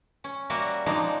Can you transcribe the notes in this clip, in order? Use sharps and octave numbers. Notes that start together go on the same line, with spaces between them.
C#4
G3 A#3 F#4 E5
F3 F#3 G#3 A#3 D4 D#4